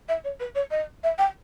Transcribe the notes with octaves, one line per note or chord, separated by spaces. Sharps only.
E5
C#5
B4
C#5
D#5
E5
G5